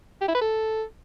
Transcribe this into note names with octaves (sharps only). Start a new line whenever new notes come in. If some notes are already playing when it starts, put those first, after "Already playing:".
G4
E4
B4
A4